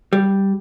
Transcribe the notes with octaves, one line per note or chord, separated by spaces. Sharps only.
G3